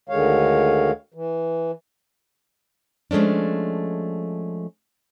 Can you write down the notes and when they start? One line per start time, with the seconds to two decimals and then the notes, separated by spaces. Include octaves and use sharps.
0.09 D2 D3 D#3 G#3 C#5 F5
1.14 E3
3.11 F3 G#3 A3 C#4 D4